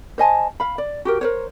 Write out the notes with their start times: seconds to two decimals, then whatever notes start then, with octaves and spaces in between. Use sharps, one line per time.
0.18 C5 D#5 G#5 A5
0.60 F5 B5
0.78 D5
1.05 F#4 G4 A#4
1.21 A#4 C5 C#5